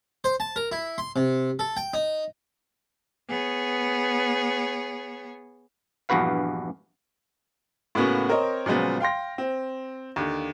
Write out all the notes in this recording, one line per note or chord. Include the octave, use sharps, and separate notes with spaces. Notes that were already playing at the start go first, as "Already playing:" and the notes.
C5
A5
A#4
E4
C6
C3
A4
G5
D#4
B3 G#4 C#5
A#1 E2 G2 F#4 B4 F5
A2 C#3 A#3 B3 C#4 F#4
C4 A#4 C5 C#5 D#5
A#2 C#3 F3 F#3 G#3 B3
F5 G5 C6 A#6
C4
D#2 D3